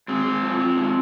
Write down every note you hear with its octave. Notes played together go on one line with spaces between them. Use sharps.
G#2 C4
G#2
F3
F3
G#2